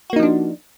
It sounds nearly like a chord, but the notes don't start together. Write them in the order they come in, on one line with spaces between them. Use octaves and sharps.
F#4 A#3 D#4 F3 D4